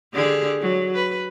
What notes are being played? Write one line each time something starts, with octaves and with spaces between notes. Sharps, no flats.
D3 G4 G#4
F#3
B4